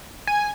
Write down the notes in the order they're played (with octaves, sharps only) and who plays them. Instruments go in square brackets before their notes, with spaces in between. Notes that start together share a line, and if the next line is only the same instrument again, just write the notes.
[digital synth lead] G#5